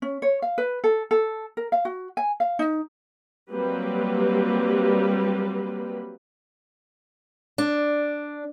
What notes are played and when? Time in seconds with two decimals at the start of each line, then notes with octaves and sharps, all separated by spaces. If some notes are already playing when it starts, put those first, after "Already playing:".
0.02 C#4
0.22 C#5
0.42 F5
0.58 B4
0.84 A4
1.11 A4
1.57 A#4
1.72 F5
1.85 F#4
2.17 G#5
2.40 F5
2.59 D#4
3.51 F#3 G3 A#3 C4 G4 B4
7.58 D4